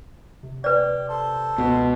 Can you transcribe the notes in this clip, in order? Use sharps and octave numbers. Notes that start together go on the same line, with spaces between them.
C3
G4 B4 D5
A4 C5
C#2 B2